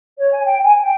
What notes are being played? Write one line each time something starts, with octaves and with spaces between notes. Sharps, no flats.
C#5
G#5
G5
G#5
G5